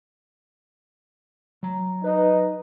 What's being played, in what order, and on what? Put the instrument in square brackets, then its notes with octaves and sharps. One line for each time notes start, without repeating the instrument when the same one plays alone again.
[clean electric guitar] F#3 A#5
[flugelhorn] D#4 [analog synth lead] B4 [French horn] D#5